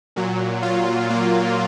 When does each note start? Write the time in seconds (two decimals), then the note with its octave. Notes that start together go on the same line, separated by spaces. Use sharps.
0.16 A#2 F#3
0.63 F4
1.10 A#3